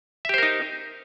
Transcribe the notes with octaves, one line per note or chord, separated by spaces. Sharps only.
D#4 G4 A#4 C5 E5